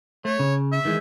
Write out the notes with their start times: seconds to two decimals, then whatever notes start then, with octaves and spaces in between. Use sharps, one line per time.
0.25 A3 C#5
0.39 C#3
0.72 E5
0.85 D#3 E3 G#3